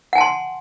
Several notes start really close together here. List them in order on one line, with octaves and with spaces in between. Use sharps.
F#5 G#5 A5 C6